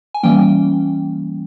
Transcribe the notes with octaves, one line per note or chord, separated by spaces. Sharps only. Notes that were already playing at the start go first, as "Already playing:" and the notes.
G#5
E3 G3 A#3 C#4 G5